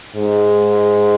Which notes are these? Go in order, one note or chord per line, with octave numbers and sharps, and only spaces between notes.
G#2